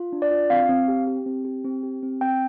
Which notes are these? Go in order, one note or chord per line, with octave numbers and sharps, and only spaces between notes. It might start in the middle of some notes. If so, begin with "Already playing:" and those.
Already playing: F4
D4
D5
F4
C4 F5
C4
G4
G4
C4
G4
C4
G4
C4
C4 G5